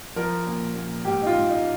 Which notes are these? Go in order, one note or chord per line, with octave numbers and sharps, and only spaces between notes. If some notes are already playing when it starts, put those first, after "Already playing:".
F3 A#4
A#2
A#2
G#2 G4
D#4
F4
G#2
D#4